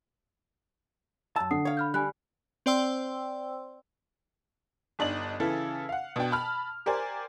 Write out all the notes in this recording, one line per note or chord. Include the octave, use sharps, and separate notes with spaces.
F#2 A5 E6
D3 F#5 D#6 C7
C#5 F5
B5 F6 G6
G3 G#5 B5 F#6
C4 C5 D5 G5 C6 E6
G1 D4 D#4 F#7
C#3 E3 E4 A4
F5 F#5
B2 D4 G5
A5 B5 F6
G4 A#4 C5 D5 G#5